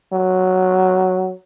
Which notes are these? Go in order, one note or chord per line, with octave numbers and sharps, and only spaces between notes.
F#3